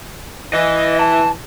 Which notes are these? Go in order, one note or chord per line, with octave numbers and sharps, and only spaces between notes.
E3 D#5
A5